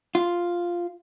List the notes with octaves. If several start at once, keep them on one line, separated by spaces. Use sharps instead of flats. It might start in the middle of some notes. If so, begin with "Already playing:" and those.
F4